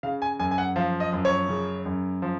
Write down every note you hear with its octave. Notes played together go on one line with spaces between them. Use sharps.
C#3 F5
G#5
F#2 G#5
G#5
F#5
F3 F5
D#5
F#2
C#5
C#3
F#2
F3